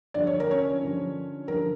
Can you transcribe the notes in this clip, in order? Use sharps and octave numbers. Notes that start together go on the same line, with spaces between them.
G2 D3 F3 D5
C#5
A#4
C#4 C#5
G2 D3 F3
G2 D3 F3 A#4